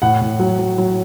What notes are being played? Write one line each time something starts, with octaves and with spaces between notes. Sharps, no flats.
A2 F#5
A2
F#3
F#3
F#3